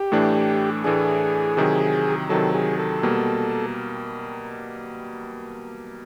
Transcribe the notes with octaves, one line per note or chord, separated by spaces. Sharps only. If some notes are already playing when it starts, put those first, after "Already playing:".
Already playing: G4
A2 E3 A3 D4
A2 E3 A3 D4 G#4
C3 D#3 F#3
C3 D#3 F#3 A4
G#4
A4
B2 G3 A#3